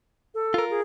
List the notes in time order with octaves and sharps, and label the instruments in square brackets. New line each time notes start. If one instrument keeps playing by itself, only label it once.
[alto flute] A4
[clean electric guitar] F4 A#4
[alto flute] G#4